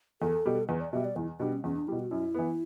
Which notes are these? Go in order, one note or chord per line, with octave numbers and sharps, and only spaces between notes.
E2 A4
B2 G3
E2 B4
D5
B2 G3 E5
D5
E2 E4
B2 G3 D4
C#4
E2 C#4
D4
B2 G3 E4
F#4
F#2 E4
E3 B3